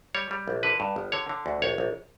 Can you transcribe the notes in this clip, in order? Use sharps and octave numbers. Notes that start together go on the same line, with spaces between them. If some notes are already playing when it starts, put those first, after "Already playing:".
G3 C#5
G3
A#1
D3 B4
G2
G1
D3 C#5
D3
D2
A#1 C#5
A#1